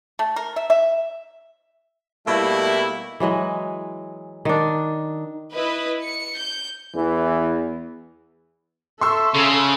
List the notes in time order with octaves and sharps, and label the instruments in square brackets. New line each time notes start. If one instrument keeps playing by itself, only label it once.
[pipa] A3
A#4
E5
E5
[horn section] B2 G3 A3 A#3 E4
[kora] E3 F#3 G#3 D#5
D#3 D4
[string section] E4 B4 D#5
C#7
G6
[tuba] E2 [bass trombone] E3
[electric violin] A4 E5 [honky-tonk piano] C6 C#6 E6
[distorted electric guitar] C#3